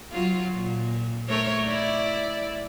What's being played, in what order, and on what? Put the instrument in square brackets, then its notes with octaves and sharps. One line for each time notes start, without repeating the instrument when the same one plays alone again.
[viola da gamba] F#3 F4
A#2
A3 A#4 C#5
E4 D5